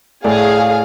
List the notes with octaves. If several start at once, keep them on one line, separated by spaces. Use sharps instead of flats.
A2 A3 G#4 D5 F5